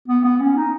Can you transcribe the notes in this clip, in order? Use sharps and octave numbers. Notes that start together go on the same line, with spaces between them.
B3
B3
C#4
D#4